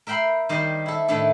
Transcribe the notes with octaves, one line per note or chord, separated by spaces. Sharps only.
A#4 E5 G5 B5 C6
D#3 G3 G4 C5 D#5
E4 A4
A2 D#3 A3 D4 A4 D5